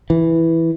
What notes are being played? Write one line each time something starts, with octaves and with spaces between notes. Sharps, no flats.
E3